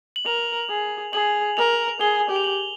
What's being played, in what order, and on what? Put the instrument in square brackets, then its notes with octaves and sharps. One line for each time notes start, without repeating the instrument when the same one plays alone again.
[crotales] F#7
[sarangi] A#4 [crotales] F7
[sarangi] G#4
[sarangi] G#4 [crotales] F#7
[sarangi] A#4 [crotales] F7
[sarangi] G#4 [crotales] G7
[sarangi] G4
[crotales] F7
F#7